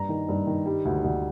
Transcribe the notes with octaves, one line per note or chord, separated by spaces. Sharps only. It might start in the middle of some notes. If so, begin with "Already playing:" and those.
Already playing: G2 A#5
D#3
G2
D#3
G3
D2
D2